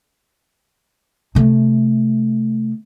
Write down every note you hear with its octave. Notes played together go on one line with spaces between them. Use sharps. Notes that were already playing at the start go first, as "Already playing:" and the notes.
C3 A3